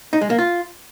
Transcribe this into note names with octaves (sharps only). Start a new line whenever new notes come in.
D#4
G#3
A#3
F4